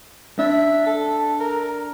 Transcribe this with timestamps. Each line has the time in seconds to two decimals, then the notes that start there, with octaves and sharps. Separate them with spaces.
0.39 D4 E5
0.86 A4
1.40 A#4